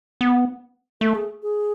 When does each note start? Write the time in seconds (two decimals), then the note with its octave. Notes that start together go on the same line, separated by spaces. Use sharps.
0.21 B3
1.01 A3 A4
1.15 G#4
1.43 G#4